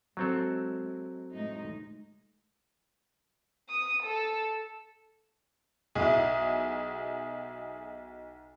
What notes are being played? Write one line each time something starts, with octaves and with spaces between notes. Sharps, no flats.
F#3 G#3 C4 A4
A2 G#3 D#4
D#6
A4
B1 E4 G#4